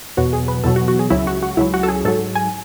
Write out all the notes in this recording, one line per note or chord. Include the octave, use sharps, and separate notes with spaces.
E2 B2 F#3 F#4
G#4
B4
E2 B2 F#3 A4
F#4
F#4
G#4
C#2 C#3 F#3 E4
F#4
F#4
C#2 C#3 F#3 E4
F#4
A4
G#4
G#2 F#3 A4
G#5